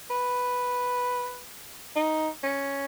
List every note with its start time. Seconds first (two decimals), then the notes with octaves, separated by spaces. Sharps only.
0.10 B4
1.96 D#4
2.44 C#4